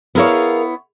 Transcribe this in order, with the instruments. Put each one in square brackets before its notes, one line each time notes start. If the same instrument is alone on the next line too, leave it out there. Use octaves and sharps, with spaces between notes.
[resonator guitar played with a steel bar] B3 E4 C#5 [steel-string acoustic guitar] G#4 A#4 F5